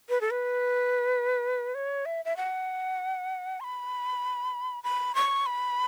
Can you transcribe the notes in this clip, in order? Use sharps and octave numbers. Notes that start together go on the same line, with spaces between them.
B4
A4
B4
C#5
E5
E5
F#5
C#6
B5
B5
C#6
B5